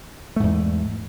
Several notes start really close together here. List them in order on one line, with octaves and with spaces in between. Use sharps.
A3 G#2 E2